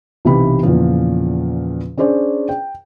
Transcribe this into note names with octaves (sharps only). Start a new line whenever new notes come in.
B1 C3 E3 G4 B5
E2 A#2 C#3 F3
C#4 D4 G#4 C5 D5
G5